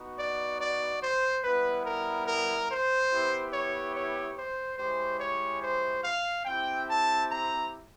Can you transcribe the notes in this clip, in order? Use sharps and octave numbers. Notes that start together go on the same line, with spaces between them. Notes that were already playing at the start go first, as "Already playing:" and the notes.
Already playing: B3 D#4 F#4
D5
D5
C5
G3 B3 E4 B4
A#4
A#4
C5
B3 E4 G4
C#5
C#5
C5
G#3 C#4 E4 G4 C5
C#5
C5
F5
C4 E4 G4 G5
A5
A#5